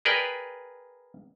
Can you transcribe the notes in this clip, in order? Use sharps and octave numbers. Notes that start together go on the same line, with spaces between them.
G#4 A#4 B4 D5 G5